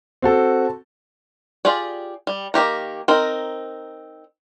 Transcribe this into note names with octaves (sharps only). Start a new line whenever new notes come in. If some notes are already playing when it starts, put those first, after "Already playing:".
C4 F#4 A4
F4 G4 G#4 D5
G3
D#3 A#3 G4 A#5
C4 D#4 A#4